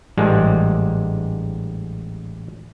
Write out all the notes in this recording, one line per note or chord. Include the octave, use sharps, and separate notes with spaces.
A1 G#2 G3 G#3